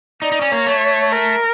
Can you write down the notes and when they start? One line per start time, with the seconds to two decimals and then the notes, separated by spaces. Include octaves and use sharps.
0.22 D#4 D5
0.32 D#4
0.41 C#4
0.51 A#3 C#5
0.67 A3
1.12 A#4